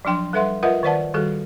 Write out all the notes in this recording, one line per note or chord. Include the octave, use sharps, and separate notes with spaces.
F3 F#3 D4 G5 C6
G3 A4 B4 E5 F#5 C6
F4 A#4 B4 D#5 E5 F#5
D#3 B4 C5 D5 F#5 A5
D#3 G3 F#4 G#4 A4